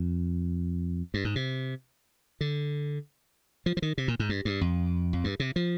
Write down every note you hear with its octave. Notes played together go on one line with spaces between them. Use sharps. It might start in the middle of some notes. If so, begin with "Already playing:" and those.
Already playing: F2
G2
G#2
C3
D3
F3
F3
D#3
C3
A#2
G#2
G2
G2
F2
F2
G2
C3
F3